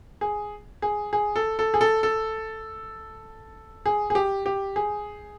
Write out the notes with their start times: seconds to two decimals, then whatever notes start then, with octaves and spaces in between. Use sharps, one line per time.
0.21 G#4
0.82 G#4
1.13 G#4
1.36 A4
1.59 A4
1.74 G#4
1.81 A4
2.03 A4
3.86 G#4
4.10 G#4
4.15 G4
4.46 G4
4.76 G#4